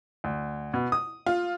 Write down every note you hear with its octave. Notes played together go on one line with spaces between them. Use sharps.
D2
B2
D#6
F4